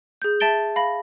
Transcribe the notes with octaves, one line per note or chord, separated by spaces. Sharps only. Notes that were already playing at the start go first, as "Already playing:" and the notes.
G#4 G6
E5 A5 A6 D7 G7
F5 B5 A#6